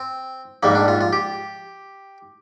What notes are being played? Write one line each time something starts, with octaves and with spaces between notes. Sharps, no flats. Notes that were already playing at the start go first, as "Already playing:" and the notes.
Already playing: C4
A#1 G#2 G3 A#3
D4
F4
F4
G4